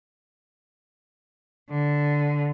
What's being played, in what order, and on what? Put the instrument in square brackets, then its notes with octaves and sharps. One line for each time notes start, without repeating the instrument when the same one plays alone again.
[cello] D3